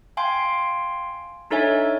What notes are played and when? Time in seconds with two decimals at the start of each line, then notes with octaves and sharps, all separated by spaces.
0.17 F5 G5 G#5 C6
1.50 D4 D#4 A4 C#5 E5 G#5